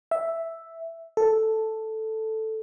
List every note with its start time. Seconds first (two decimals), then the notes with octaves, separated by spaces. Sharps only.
0.11 E5
1.17 A4